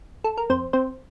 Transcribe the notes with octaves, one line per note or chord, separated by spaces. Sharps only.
A4
A#4
F2 C4 C5
C4 C5